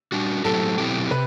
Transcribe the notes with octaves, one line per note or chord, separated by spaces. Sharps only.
G3 D4 F#4
A2 F#3 C4 E4 G4 A4
B2 F#3 C4 E4 G4
C3 B4